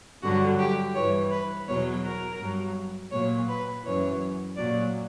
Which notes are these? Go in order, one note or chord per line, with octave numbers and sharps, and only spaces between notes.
G2 D3 F#3 F#4
G4
G2 E3 C#5
B4
E2 B2 F#3 C#5
A#4
G2 F#3
A#2 F#3 C#5
B4
F#2 E3 C#5
A#2 F#3 D5